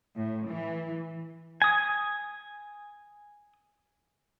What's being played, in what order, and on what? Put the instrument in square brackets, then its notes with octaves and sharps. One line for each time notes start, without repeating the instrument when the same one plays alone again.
[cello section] A2
E3
[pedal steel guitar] G#5 D#6